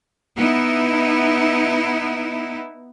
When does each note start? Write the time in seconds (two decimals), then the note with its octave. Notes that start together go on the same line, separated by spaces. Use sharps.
0.37 B3 D#4 E4